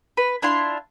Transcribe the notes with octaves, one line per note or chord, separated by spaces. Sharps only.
B4
D4 E4 F4 C6